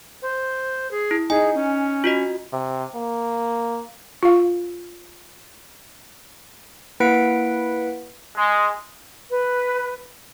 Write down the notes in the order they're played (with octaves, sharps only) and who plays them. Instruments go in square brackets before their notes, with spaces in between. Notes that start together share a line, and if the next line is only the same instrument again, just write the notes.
[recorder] C5
G#4
[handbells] E4
[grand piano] D#4 [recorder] G#4 [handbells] G#5
[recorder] C#4
[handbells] F4 F#4 D#5
[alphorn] C3
A#3
[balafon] F4 F5
[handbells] A#3 E4 B4 F#5 B6 D7
[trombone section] G#3
[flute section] B4